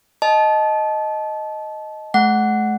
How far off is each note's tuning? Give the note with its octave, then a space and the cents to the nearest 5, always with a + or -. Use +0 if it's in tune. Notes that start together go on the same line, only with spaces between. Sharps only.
D#5 +0 A5 -20
A3 -45 F#5 +0